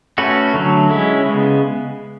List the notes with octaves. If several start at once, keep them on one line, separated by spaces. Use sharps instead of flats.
A3 C#4 F#4 B4
D3 F#3 A3
G#3 C#4 E4
C#3 G#3 B3